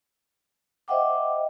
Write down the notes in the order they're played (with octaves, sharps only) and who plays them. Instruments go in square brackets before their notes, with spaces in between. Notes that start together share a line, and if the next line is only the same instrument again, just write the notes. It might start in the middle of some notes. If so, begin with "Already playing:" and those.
[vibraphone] C5 D#5 E5 F#5 G5 D6